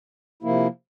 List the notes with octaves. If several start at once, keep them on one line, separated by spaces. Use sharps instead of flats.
C3 F3 A#3 E4